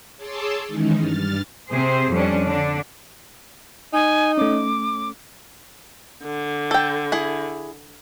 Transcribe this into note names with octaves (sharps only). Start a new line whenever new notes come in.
G#4 C#5 A5 C6 D6 E6
D#3 E3 G#3 C#4 D#4
G2 F6 A6
C3 C4 G#4 C5
F2 G3 C#4 D4
D3 D4
D#4 G#5
A3 C#4 D6
D3
A4 G5
E4 G#4